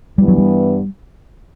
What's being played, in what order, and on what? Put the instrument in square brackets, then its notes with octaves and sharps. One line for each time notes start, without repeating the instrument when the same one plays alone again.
[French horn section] G2 E3 B3 [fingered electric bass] G3
[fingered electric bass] F#3
G3